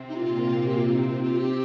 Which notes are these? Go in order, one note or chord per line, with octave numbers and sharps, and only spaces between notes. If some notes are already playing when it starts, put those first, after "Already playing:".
Already playing: C3 C4
D#4
A#2 A#3 F4
G4
C3 C4 F4
D#4
F4
F4
G4